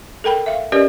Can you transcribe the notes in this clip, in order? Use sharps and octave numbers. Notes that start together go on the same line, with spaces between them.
A4 A#4 G5 B5
E5 F5
C#4 G4 A#4 B4 D5 D#5